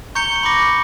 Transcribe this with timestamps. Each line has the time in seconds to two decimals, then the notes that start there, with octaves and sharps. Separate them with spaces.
0.15 A#5 C#6 G6 C#7 G7
0.43 B5 D6 A#6 C#7